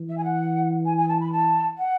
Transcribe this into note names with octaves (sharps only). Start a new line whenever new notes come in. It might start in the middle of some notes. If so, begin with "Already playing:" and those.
Already playing: E3
E5
G#5
F#5
G#5
G#5
A5
B5
A5
F#5